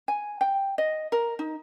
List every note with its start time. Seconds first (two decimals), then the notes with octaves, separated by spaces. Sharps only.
0.08 G#5
0.41 G5
0.78 D#5
1.12 A#4
1.39 D#4